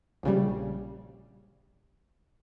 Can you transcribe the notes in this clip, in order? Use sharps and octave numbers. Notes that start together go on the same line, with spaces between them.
A#1 C#3 G3